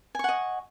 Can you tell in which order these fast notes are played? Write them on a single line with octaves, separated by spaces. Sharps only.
G#5 C#6 F#5 D#5